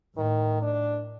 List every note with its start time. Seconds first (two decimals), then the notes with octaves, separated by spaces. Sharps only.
0.17 A2 D#3
0.62 D4